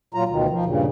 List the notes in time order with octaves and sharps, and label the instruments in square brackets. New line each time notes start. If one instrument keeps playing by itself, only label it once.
[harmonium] A#2 F#3 F4 A#5
D2 B2 D#3
F3
G2 A#2 C#3